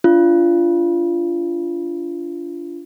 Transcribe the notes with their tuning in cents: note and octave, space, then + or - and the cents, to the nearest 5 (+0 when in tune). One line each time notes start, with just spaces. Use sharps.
D4 -20 F4 -25